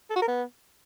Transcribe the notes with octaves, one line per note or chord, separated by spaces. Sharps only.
A4
F#4
A#4
B3